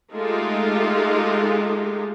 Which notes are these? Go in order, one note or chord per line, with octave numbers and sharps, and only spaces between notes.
G#3 A3 D#4 F4 G4 A4